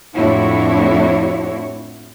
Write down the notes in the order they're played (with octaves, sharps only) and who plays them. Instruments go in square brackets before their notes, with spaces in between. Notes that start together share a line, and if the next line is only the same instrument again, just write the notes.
[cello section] F2 A2 D4 E4 F#4 C#5